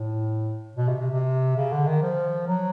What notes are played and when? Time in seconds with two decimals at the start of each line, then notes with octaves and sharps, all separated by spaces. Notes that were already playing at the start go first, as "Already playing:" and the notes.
Already playing: A2
0.77 B2
0.89 C3
1.00 C3
1.11 C3
1.57 C#3
1.72 D3
1.87 D#3
2.02 F3
2.47 F#3